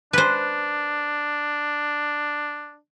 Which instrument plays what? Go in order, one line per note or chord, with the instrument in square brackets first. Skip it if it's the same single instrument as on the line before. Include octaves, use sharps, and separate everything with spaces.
[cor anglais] D4 [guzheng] B4 C5